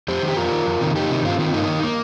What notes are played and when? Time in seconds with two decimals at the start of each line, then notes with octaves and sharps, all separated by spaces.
0.08 F2 G4 C5
0.23 D#3
0.28 G4
0.36 F2 F4 A#4
0.52 D#3
0.66 F2
0.81 C3 D#3
0.95 F2 D#4 G4
1.10 C3 D#3
1.25 G2 C4 F4
1.39 D#3 C4 F4
1.54 G2 A#3 D#4
1.68 D#3
1.83 A#3